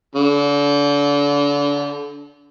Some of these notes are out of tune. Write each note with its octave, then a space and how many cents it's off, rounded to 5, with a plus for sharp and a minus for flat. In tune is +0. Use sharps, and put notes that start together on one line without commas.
D3 -35